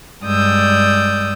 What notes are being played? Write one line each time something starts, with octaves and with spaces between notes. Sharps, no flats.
G2 G#3 D5 D#6 E6 G6